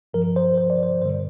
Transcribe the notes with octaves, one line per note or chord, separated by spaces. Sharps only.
G2 F3 A#4
C5
C5
D5
C5
G2 D3 G3 C5